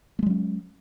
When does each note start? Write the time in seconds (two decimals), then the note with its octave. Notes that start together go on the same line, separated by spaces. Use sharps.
0.19 A3
0.23 G#3
0.26 F#3
0.30 C#4